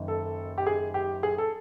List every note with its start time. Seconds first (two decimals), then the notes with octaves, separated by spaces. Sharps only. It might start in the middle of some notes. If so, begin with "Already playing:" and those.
Already playing: F#1 F#2 D#3
0.08 A4
0.58 G4
0.67 G#4
0.94 G4
1.23 G#4
1.38 A4